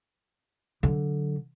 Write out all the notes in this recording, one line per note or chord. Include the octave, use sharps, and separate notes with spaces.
D3 F#3